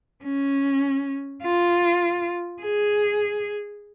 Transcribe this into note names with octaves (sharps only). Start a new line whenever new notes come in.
C#4
F4
G#4